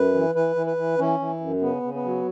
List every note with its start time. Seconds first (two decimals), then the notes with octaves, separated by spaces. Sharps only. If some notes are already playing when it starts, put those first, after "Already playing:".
Already playing: F#2 B4
0.14 E3
0.34 E3 B4
0.56 E3
0.66 B4
0.77 E3
0.98 E3 C#4
1.19 E3
1.40 F#2
1.61 C#3 B3
1.83 C#3
1.94 B3
2.04 F#3